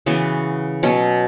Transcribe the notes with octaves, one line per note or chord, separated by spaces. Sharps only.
C#3 E3 B3 F#4
B2 F#3 C#4